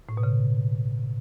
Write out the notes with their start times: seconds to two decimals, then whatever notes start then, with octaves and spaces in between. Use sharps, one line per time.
0.09 A2
0.17 B2
0.23 C#3